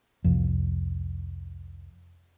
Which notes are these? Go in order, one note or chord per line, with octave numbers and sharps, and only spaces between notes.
C2 F2